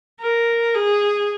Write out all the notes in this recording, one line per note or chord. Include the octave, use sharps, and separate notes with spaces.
A#4
G#4